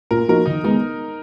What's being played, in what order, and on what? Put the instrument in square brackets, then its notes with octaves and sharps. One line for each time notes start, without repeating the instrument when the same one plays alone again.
[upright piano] A#2 [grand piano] A#4
[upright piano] F3 A#3 D#4 F#4 [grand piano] A#4
[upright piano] D#3 [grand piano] D#4
[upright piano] G#3 B3 [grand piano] D#4